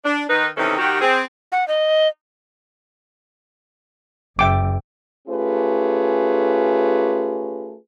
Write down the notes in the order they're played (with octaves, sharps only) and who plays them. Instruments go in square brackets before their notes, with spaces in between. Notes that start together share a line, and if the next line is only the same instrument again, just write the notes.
[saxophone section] D4
D#3 D#4 B4
C3 D#3 E3 C#4 D#4 A4
D#3 F#4 G4
C4 G#4
[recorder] F#5
D#5
[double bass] F#1 [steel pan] E5 G5 D6
[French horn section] A3 C#4 F4 G4 G#4 B4